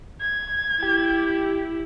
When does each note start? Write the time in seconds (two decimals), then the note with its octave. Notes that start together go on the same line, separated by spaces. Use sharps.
0.20 G#6
0.82 E4 G4